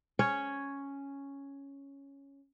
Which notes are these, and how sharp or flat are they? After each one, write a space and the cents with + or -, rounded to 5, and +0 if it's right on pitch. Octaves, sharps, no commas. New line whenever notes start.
C#4 +0 C#5 +0